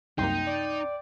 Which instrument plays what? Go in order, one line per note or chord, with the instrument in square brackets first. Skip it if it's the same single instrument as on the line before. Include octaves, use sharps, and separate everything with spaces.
[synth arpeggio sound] C2 F#2 A#3 [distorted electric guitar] D#4 [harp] G5 C6
[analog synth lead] D5